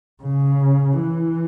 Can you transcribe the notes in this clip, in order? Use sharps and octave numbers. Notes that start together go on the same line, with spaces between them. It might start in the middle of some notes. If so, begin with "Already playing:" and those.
C#3
E3